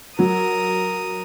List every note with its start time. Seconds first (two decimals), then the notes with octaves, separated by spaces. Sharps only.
0.19 F#3 A#4 D#6